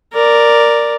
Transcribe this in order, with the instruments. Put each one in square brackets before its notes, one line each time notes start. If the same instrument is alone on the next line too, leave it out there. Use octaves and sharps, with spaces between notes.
[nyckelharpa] A#4 D5